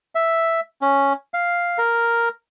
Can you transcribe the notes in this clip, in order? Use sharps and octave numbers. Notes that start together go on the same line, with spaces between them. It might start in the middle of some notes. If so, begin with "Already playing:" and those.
E5
C#4
F5
A#4